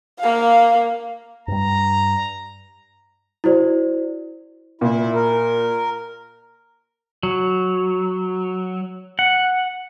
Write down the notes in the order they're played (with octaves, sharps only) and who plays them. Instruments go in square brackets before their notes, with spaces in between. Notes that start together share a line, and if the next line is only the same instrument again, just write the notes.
[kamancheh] A#3 F5
[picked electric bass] G2 G3 [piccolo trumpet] A#5
[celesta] E4 F#4 C5 D5
[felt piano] A#2 [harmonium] E4
[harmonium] A#4
[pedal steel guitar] F#3
F#5